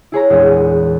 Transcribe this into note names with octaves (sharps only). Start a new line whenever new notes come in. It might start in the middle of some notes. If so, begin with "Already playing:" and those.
E4 G#4 C#5 A#5
A#1 E2 G#3